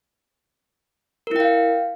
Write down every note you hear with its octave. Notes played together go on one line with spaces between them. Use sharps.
E4 A#4 F5 G5